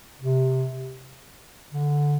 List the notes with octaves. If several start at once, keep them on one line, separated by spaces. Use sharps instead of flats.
C3
D3